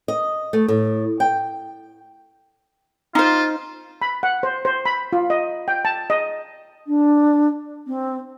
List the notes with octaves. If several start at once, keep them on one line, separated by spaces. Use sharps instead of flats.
D#5
A3
A2
G5
D#4 F4 C5
B5
F#5
C5
C5
B5
F4
D#5
G5
A5
D#5
D4
C4